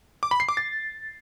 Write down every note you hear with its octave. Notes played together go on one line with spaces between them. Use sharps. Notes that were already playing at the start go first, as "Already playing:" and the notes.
D6
B5
C7
D6
A6